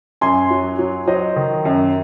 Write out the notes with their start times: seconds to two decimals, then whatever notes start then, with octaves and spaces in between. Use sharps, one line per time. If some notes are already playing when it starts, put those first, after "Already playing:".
0.21 F#2 G#5 C6
0.50 F#3
0.79 F#3
1.07 F#3 C5 D#5
1.36 D#3
1.65 F#2